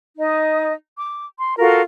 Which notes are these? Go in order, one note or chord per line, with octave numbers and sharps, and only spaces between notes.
D#4 D#5
D6
C6
F4 F#4 A4 A#4